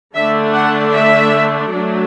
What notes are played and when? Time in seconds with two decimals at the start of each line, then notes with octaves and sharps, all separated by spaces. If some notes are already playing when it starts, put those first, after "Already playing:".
0.15 D3 A3 D4 E5
0.54 F#5
0.93 E5
1.70 F#3 A3 D4